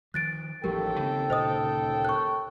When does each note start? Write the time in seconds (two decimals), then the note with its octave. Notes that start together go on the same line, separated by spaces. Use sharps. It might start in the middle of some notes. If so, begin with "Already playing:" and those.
0.14 D#3 F3 F#6 A6 D7
0.64 A1 D#2 F3 G3 G4 A4 A#4 G5
1.00 C#3 C4
1.30 D2 A#2 C#3 C5 D#5 D#6
2.05 C#6 F#6